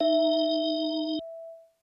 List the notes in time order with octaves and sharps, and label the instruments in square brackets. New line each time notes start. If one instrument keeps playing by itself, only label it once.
[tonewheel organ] D#4 [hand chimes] E5